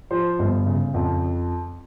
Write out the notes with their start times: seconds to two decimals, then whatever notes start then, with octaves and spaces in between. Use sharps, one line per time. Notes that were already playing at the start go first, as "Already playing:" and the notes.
0.11 F3 C5
0.39 G1
0.66 C#3
0.94 F2